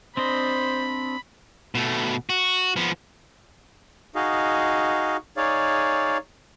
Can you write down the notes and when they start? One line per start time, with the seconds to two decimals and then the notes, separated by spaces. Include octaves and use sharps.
0.17 C4 D4 C5 D#5 B5
1.75 B2 A3
2.30 F#4
2.76 F3 B3
4.15 D#4 F#4 G#4 D#5 F5
5.37 D#4 G#4 C#5 D5 F5